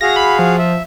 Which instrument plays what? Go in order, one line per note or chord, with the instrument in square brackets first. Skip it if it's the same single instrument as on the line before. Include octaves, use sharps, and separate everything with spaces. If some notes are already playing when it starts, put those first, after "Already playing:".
[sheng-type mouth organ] F#4 G#4 F5 [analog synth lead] A#6
[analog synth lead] B5
F3
[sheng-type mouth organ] E5